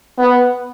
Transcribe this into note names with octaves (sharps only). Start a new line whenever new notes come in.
B3